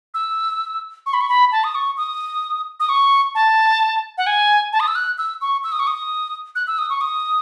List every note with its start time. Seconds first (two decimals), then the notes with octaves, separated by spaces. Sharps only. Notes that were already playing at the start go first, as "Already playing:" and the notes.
0.14 E6
1.06 C#6
1.13 B5
1.21 C#6
1.29 B5
1.52 A5
1.64 D#6
1.75 C#6
1.97 D#6
2.80 D#6
2.89 C#6
3.35 A5
4.18 F#5
4.27 G#5
4.73 A5
4.80 D#6
4.88 E6
4.95 F#6
5.18 E6
5.41 C#6
5.64 E6
5.72 D#6
5.79 C#6
5.87 D#6
6.55 F#6
6.67 E6
6.78 D#6
6.90 C#6
7.01 D#6